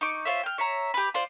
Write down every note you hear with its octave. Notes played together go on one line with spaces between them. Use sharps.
D#4 C#6 D6
F4 C5 C#5 E5
G5 F6
C#5 E5 A#5
G4 B4
F4 C5 D5